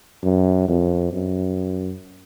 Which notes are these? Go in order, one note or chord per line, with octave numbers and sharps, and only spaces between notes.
F#2
F2
F#2